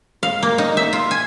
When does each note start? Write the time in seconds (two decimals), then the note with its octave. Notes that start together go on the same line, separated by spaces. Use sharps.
0.23 F5
0.43 A#3
0.58 D#4
0.77 E5
0.93 F4
1.11 G#5